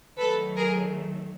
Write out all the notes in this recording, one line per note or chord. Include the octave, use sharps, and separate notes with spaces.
D#3 F#3 A3 A4 B4
G#4 A#4